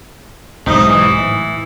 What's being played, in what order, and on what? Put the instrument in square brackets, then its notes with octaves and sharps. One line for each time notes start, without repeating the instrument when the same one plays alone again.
[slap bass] B1 G#2 F#3 [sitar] C3 D#4
[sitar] E3
[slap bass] A2